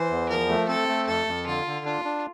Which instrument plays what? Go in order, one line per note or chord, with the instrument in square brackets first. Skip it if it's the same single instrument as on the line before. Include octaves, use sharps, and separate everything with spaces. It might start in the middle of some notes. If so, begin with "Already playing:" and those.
Already playing: [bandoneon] E3 [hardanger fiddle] C5
[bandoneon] E2
[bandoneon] F3 [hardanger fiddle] A#4
[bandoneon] A3
[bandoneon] C4 [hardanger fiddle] A4
[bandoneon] A3
[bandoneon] F2 [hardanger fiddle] A4
[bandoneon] F2
[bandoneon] D3 [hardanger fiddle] F4
[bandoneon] D3
[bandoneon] D4 [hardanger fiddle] F4
[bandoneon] D4